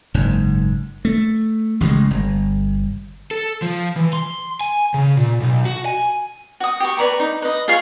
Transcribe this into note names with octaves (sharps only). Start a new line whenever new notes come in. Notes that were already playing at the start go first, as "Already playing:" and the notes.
F#1 G#2
A3
A1 C#3 F3 G#3
G1
A4
F3
E3
C6
G#5
C#3
A#2
B1
F#4
G#5
F#4 D#6
G4 C#6
B4 D5 A#5 C#6
D#4
B4 D#5
F4 G#4 F5 C#6